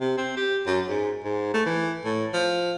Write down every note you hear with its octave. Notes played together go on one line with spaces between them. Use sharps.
C3
C4
G4
F#2
G#2
G#2
A3
E3
A2
F3